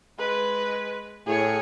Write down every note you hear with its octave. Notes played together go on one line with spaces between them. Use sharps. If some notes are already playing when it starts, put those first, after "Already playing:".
G#3 B4
A2 G#4 C#5